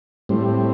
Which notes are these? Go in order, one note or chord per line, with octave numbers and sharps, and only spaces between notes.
A2 G3 C4